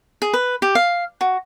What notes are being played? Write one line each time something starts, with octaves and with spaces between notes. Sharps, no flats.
G#4
B4
G4
F5
F#4